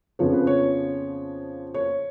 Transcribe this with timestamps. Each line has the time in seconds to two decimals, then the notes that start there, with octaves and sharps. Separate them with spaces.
0.19 F2 C#3 F3 B3 C#5
0.33 B4
0.47 C#5
1.74 C#5